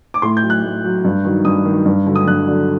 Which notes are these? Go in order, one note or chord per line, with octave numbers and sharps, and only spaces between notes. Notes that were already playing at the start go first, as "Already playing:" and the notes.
D6
A2 C6
G6
F#3
F#6
A2
F#3
G2
D#3 F#3
G2 D#6
D#3 F#3
G2
D3 F#3
D#6
G2 F#6
D3 F#3